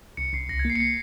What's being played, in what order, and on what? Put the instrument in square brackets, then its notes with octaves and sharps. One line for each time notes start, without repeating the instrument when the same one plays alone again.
[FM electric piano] C2 [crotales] C#7
[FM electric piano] C2 [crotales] C7
[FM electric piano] C#2 [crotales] A#6
[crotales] G#6
[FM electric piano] A#3
[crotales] C7
C#7
C7